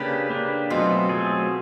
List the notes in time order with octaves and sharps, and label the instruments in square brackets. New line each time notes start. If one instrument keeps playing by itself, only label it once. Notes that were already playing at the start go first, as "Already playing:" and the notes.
Already playing: [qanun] C#3 [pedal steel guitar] A#3 D4 G4 B4
[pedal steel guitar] A#3 D4 G4 B4
[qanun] B2 [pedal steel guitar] F#3 A3 C4 F4 G#4
[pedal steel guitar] F#3 A3 C4 F4 G#4